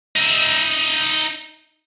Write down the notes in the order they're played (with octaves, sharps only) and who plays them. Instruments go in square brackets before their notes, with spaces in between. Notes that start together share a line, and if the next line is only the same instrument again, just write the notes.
[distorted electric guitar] D#4 E5